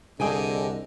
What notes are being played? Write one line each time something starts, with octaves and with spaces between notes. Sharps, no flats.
C2 D3 G#4 D#5 G5 G#5